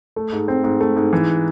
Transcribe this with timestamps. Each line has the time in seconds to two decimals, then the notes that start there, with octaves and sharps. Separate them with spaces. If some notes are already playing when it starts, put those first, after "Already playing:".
0.16 A3
0.32 G#2
0.48 C4
0.64 G#2
0.81 A3
0.96 G#2
1.13 E3